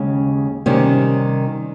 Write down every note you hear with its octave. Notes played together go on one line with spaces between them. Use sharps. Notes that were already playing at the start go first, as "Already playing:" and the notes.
Already playing: D#2 C#3 G#3
C3 D#3 G3 C#4 G4